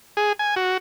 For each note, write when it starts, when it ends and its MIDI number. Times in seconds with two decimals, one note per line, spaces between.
0.17 0.33 68
0.39 0.55 80
0.56 0.77 66